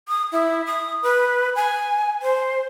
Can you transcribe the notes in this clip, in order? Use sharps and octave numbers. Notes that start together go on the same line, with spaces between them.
D#6
E4
D#6
B4
G#5
C5